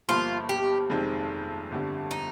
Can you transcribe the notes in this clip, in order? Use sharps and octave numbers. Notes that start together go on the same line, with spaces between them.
G1 G2 F3 A#3 F4
G4
F1 F2 D#3 G#3 C4
G1 F2 D3 G3
D#4